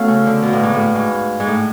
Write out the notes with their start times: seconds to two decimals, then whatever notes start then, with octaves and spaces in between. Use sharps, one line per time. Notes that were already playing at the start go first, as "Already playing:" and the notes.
Already playing: A3 B3 C#4 F#4 A4 C#5 F5
0.08 C#3
0.26 D3
0.42 B2 F#4 B4 F5
0.53 A2
0.63 G#2
0.74 A2
0.95 G#2
1.40 G#2
1.47 A2